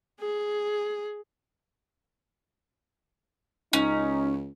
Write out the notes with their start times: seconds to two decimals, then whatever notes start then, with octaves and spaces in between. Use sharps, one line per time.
0.21 G#4
3.73 C#2 C#4 D#4